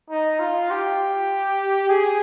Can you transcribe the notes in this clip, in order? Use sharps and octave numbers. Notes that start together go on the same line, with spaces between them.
D#4
F4
G4
G#4